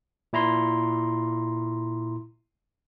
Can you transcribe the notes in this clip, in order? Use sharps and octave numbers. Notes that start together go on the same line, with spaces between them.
A#2 E4 A#5 C6